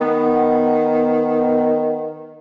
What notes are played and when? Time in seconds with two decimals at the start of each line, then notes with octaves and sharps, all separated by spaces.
0.01 D#3 B3